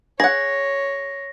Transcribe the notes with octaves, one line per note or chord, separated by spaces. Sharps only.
G#4 C#5 F#5 A#6